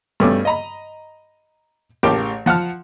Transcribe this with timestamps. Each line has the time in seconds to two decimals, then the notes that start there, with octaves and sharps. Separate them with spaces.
0.20 G2 B2 A3 C#4 D6
0.45 D#5 A#5 B5
2.03 A1 C#3 G4 A#4 G5 A5
2.46 F3 F#5 A5 F6